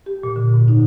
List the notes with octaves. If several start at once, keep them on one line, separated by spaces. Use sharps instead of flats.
G4
A#2
D3
G#2
D#4